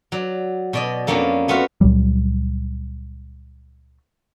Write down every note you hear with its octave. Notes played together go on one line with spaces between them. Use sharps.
F#3 D5
B2 D5 D#5
F2 A#3 B3 C#4 D4
A3 B3 F4 F#4 F5
C#2 A#2 F#3 G3